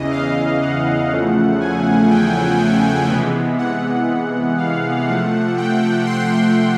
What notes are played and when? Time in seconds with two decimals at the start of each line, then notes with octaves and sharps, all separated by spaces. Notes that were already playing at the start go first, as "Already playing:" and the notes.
Already playing: E2 C#3 E3 D#5
0.12 F5
0.62 F#5
1.11 E2 C#3 F3 A3
1.60 G#5
2.10 G5
3.09 C3 E3 G#3 B3
3.58 F#5
4.58 F5
5.07 C3 F3 A3 F#5
5.57 G5
6.06 C6